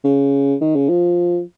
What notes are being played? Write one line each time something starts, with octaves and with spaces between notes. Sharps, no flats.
C#3
D#3
C#3
F3